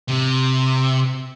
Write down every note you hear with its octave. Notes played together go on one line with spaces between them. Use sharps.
C3